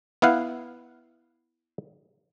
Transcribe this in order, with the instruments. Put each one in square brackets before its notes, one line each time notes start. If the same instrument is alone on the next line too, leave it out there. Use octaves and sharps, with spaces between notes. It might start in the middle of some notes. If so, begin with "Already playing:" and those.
[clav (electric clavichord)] B3 E4 F5 F#5